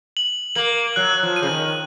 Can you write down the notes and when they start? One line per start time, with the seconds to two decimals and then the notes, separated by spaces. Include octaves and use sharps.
0.17 F#7
0.55 A#3 F#7
0.96 F#3 F#6
1.23 F3
1.36 D#7
1.42 C#3
1.49 D#3